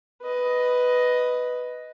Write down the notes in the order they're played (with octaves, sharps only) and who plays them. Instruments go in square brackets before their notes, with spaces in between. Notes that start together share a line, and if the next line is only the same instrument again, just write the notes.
[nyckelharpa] B4 D#5